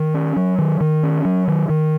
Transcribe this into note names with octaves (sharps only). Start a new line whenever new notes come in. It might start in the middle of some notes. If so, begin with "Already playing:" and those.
Already playing: D#3
C#4
F#3
D#3
D#3
C#4
F#3
D#3
D#3